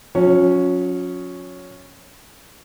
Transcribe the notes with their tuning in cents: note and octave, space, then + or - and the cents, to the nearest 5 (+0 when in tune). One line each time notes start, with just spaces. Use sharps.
F#3 -45 C#4 +0